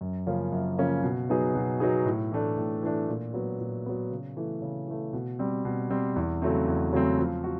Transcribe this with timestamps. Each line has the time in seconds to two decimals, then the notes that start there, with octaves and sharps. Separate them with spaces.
0.01 F#2
0.27 C#3 F3 A#3 C#4
0.52 F#2
0.78 C#3 F3 A#3 C#4
1.03 B2
1.30 F#3 B3 D#4 G#4
1.55 B2
1.80 F#3 B3 D#4 G#4
2.06 A2
2.32 E3 A3 D4
2.57 A2
2.83 E3 A3 D4
3.09 A#2
3.34 F#3 B3
3.60 A#2
3.86 F#3 B3
4.11 C#3
4.36 E3 A3
4.62 C#3
4.88 E3 A3
5.13 B2
5.39 G3 C4
5.65 B2
5.91 G3 C4
6.16 E2
6.42 C#3 F#3 A3 C4
6.67 E2
6.93 C#3 F#3 A3 C4
7.19 F3
7.44 F#4